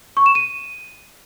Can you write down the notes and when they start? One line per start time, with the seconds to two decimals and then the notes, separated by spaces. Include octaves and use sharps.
0.17 C#6
0.26 E7
0.35 D#7